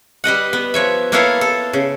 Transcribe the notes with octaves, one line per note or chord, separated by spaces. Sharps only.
G3 B4 D#5 F#5
B3
F3 C#5 E5
A#3 B3 E4 A4 C#5 F5
A4
C#3